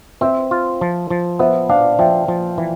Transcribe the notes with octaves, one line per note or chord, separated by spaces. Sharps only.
C4 C5 E5
F4
F3
F3
B3 C5 E5
D4 D5 F5
F3 E5 G5
F3
E3